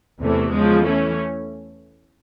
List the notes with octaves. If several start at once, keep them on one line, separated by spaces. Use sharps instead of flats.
E2 C3 E3 A3
C#3 F3 G#3
E3 A3 C#4